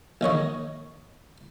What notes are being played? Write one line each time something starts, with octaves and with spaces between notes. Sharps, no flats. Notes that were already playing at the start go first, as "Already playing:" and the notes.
A#1 D#3 C#5 D#5